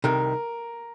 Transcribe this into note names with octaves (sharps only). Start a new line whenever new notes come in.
C2 C3 D#3 A#4